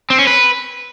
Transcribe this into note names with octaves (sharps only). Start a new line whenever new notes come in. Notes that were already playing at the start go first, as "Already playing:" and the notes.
C4
C#4
B4